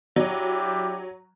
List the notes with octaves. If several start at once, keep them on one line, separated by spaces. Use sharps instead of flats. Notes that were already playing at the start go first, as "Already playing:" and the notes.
F#3 D4 E4 G4